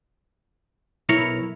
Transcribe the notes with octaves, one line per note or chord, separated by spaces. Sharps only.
B1 E4 A#4 C#5